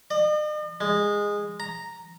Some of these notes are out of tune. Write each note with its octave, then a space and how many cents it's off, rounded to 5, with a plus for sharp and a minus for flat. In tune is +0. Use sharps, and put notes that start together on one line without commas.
D#5 -45
G#3 -15
A#5 -5